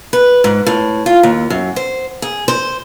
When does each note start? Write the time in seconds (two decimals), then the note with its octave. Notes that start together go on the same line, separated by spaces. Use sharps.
0.13 B4
0.44 G#2
0.66 A2
1.06 F4
1.23 D#2
1.50 F#2
1.76 C5
2.22 G#4
2.48 C5